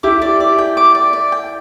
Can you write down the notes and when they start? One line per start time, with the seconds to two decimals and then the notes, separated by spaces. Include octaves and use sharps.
0.03 E4 G4 D6
0.22 D5
0.40 D5
0.58 G5
0.77 D6
0.95 D5
1.13 D5
1.32 G5